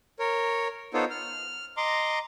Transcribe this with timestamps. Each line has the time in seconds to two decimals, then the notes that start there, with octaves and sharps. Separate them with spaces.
0.19 A#4 C#5
0.94 B3 D#4 F4 A4 C5 C#5
1.10 F6
1.77 D#5 A#5 C6 D6